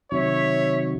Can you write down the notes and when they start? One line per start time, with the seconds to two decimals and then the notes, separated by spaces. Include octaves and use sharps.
0.12 C3 D#3 F#3 C#5 E5